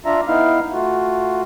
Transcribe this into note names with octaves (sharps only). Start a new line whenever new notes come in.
D4 F4 E5 A#5
B3 D#4 E4 F5
A3 F4 F#4